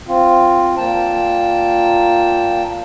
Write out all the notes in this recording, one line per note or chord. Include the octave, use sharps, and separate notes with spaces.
C4 F4
A#2 A#3 G5 A5